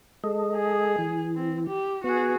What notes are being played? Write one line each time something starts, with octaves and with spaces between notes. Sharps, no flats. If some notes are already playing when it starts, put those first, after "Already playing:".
G#3 A4 D#5
G#4
E3
C4
G4
B3 F#4 G#4